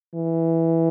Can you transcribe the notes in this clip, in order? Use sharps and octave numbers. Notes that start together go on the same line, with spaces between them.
E3